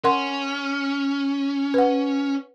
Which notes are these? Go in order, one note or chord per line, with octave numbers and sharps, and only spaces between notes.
C#4 A#4 F#5 C6
B4 F#5